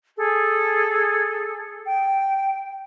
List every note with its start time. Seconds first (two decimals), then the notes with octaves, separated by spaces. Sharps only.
0.16 G#4 A4
1.85 G5